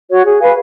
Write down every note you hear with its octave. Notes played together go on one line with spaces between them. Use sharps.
F#4 C#5
G#4
B4 F5 G#5